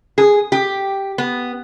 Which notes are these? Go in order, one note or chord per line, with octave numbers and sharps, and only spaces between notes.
G#4
G4
B3